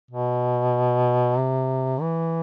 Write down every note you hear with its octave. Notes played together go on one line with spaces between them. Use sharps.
B2
C3
E3